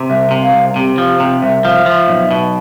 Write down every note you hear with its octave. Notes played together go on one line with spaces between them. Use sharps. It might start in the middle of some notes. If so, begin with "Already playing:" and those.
Already playing: C3
C2 E5
C3
F5
C2
C3 G4
F3
C3
C2 E5
F3
F3
B1
B2